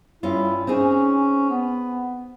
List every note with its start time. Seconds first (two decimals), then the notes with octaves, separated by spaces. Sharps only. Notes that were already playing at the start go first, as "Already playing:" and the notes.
0.23 G2 C#4 E4 F4
0.67 C4 C#4 D#4 G#4
1.50 B3